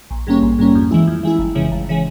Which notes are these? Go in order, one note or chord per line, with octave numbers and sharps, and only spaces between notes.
A#1
G#2 G3 A#3 C#4
A#1
G#2 G3 A#3 C#4
F2
E3 G#3 E4
F2
E3 G#3 E4
G1
F2 C#3 E3 G#3
G1
C#3 E3 G#3